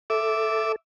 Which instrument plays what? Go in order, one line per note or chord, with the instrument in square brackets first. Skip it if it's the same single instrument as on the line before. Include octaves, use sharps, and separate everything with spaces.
[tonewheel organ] A4 [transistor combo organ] E5 D6